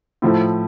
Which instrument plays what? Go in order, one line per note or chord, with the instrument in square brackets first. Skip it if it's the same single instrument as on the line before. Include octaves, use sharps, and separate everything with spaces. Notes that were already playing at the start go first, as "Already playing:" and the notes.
[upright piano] A2 F3 A3